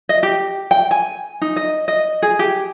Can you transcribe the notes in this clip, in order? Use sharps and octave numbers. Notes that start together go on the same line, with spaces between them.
D#5
G4
G5
G#5
D#4
D#5
D#5
G#4
G4